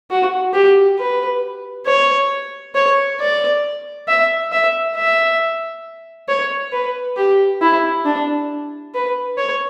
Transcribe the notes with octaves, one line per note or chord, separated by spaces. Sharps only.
F#4
G4
B4
C#5
C#5
D5
E5
E5
E5
C#5
B4
G4
E4
D4
B4
C#5